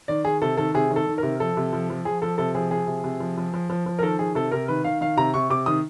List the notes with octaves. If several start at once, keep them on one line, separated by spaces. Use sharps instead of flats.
D#3 D5
D#3 G#4
C3 A4
D#3 A4
C3 G#4
D#3
A4
D#3
A#4
C3
F3 A4
C3
F3
F3
F3 G#4
F3 A4
C3 A4
F3 G#4
F3 G#4
C3
C3
F3
F3
F3
F3
F3
A#4
D#3 A4
D#3 G#4
C3 A4
C3 A#4
D#3 B4
D#3 F5
D#3 F5
C3 A#5
C3 C#6
C3 D6
D#3 D#6